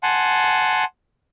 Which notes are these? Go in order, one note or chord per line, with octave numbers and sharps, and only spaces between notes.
F#5 G#5 A5 C6